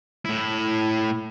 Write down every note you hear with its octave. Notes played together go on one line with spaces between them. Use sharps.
A2 E4